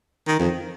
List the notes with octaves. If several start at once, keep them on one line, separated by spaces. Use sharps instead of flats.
D#3
F2